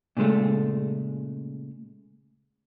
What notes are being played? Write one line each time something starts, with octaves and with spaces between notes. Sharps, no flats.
A#2 C#3 F#3 G#3 A3